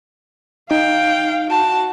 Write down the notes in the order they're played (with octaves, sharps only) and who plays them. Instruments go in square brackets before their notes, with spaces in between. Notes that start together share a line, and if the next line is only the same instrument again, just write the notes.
[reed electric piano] D#4 [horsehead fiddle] F5 [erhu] G5
[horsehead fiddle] F#4 [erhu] A5